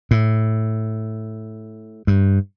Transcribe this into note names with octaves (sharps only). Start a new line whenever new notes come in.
A2
G2